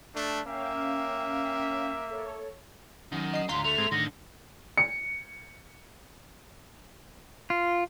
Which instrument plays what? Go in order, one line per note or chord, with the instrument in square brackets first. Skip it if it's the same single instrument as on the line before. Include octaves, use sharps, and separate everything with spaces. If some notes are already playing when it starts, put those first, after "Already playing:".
[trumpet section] A3 D4
[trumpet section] A#3 E5 [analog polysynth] C#4 F5 G5
[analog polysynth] A4 C#5
[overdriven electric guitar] F#2 [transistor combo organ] D#3
[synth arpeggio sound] D#5 C7
[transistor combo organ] D2 [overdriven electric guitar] G#2 F4 [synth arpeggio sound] A#5 C6 B6
[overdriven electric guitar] A3 [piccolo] F7
[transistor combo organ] G#2 G#3 C4
[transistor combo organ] A2 D#3 [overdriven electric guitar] D3 [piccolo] A#6
[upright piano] C#7
[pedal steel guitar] F4